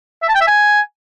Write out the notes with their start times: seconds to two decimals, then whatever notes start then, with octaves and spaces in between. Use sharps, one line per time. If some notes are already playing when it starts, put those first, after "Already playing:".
0.23 E5
0.29 A5
0.35 G5
0.41 E5
0.47 G#5